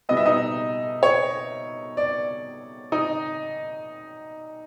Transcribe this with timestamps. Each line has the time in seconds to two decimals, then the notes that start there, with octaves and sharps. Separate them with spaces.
0.09 B2 G3 B3 D#5
0.17 E5
0.26 D#4 D#5
1.03 C#5
1.97 D5
2.92 D#4 D#5